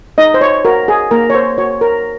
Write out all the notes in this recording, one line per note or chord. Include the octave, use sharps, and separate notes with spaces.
D#4 D#5
C5
C#5
F#4 A#4
G#4
A#3 A#4
C#5
C5
F#4 C#5
A#4